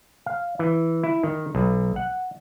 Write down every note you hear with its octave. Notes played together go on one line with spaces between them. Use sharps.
F5
E3
E4
D#3
B1
F#5